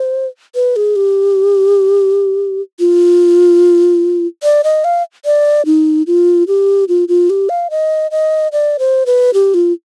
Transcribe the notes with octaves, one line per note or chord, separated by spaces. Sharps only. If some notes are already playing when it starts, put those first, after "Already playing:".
Already playing: C5
B4
G#4
G4
F4
D5
D#5
F5
D5
D#4
F4
G4
F4
F4
G4
F5
D#5
D#5
D5
C5
B4
G4
F4